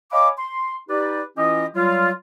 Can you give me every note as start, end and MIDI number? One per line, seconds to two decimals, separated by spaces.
0.12 0.29 73
0.12 0.29 75
0.12 0.29 77
0.12 0.29 80
0.12 0.29 83
0.12 0.29 86
0.38 0.76 84
0.90 1.22 63
0.90 1.22 67
0.90 1.22 71
0.90 1.22 74
1.37 1.66 52
1.37 1.66 61
1.37 1.66 64
1.37 1.66 65
1.37 1.66 67
1.37 1.66 75
1.75 2.11 54
1.75 2.11 55
1.75 2.11 65